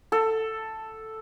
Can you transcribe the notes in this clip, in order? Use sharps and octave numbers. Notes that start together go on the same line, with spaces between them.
A4